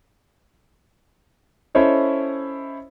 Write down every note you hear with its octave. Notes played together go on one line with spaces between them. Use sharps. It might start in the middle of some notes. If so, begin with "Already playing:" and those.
C#4 E4 A4 C5 C#5 D#5